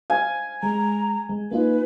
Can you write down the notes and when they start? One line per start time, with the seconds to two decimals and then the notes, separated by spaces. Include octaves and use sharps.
0.10 F5 G#5
0.63 G#3 A#5
1.29 G#3
1.51 A#3 D#4 F4 B4